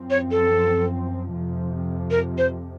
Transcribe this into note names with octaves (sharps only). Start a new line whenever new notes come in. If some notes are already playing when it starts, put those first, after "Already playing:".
Already playing: F#2 F3 C4
C#5
A4
F2 C3 F3
A#4
C5